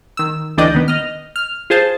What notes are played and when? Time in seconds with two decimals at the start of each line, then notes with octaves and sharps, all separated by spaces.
0.17 D#3 E6
0.57 D2 E3 D4 D5 D#5 G5
0.75 D#3 B3
0.88 D#5 F6
1.36 F6
1.70 F4 G#4 C5 A5